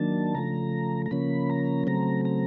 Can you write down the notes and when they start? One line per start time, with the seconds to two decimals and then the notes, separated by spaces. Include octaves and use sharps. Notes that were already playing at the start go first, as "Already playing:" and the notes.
Already playing: D#3 F#3 A#3 D4 A5
0.35 C#3 F3 A3 A#5
1.06 A#5
1.11 C#3 F3 A#3 C#4 B5
1.50 A#5
1.87 C#3 F#3 A3 C4 A#5
2.25 A#5